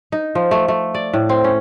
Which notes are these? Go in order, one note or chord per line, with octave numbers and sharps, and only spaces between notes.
D#4
F3
A3
A3
D5
A2
C4
C#4